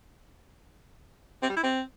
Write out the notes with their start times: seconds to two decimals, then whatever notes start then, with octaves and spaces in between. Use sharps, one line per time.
1.43 C4
1.50 G3
1.56 E4
1.63 C4